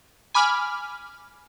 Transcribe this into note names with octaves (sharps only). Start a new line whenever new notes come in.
G#5 B5 D6 F6